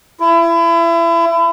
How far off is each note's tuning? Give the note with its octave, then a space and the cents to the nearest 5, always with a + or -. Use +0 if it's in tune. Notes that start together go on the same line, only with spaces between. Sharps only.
E4 +30